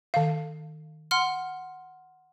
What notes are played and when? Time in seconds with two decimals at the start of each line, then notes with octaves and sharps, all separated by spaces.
0.14 D#3 F5
1.11 F#5 C6 F6